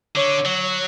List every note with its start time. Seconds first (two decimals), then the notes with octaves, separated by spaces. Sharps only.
0.16 D3 C#5
0.46 F#3 C#5